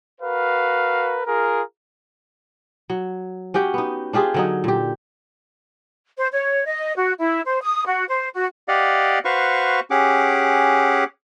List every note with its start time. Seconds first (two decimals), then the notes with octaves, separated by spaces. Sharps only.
0.20 F#4 A#4 B4 F5
1.26 F4 G#4 A#4
2.90 F#3
3.54 C#4 F#4 G4 G5
3.74 B3 D#4
4.13 D4 F4 G4 G#4
4.34 D3 F#3 D#4
4.64 A#2 G4
6.18 C5
6.31 C#5
6.65 D#5
6.95 F#4
7.19 E4
7.46 C5
7.61 D#6
7.86 F#4
8.08 C5
8.34 F#4
8.68 G4 D5 D#5 F5 F#5
9.25 F#4 B4 C5 F5 C#6
9.91 C#4 G4 G#4 F#5 D6